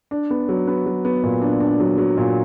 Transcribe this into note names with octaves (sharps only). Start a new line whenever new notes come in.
D4
B3
F#3
B3
F#3
B3
A#2
D4
D4
F#3
F#3
A#2